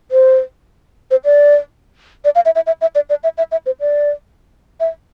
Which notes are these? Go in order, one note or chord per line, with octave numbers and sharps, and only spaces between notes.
C5
C5
D5
D5
F5
E5
E5
E5
E5
D5
D5
E5
E5
E5
C5
D5
E5